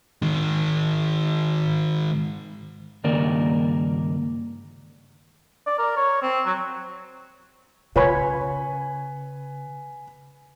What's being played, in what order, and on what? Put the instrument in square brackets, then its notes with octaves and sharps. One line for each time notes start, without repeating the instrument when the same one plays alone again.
[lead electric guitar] D#3 G#3
[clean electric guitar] C#2 G2 D#3 A#3 A#4 D5
[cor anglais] D5
A#4
C#5
C4
F#3
[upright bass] C#3 [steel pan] F4 C#5 B5 [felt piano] B4 G#5